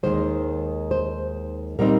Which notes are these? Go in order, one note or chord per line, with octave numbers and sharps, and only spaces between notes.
D#2 D#3 G#3 C5
C5
A#2 G3 C4 D#4 A#4